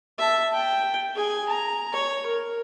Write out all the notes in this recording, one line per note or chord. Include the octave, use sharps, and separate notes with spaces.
E5 A5
G5
G#4 G#5
A#5
C#5
A#4